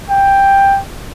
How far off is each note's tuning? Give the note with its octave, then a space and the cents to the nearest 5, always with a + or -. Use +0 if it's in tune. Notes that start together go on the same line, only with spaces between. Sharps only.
G5 +10